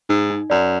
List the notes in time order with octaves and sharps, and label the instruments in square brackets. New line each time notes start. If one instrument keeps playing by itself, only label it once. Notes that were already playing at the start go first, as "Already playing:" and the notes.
[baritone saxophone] G#2 [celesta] D#4
[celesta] D#4
[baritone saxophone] F#2 [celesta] D5